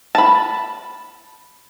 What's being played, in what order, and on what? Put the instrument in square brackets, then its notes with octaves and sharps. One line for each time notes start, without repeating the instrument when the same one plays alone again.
[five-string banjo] A5 B5